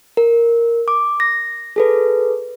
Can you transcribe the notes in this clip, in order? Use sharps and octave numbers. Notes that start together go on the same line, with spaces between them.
A#4
D6
A#6
G#4 A4 B4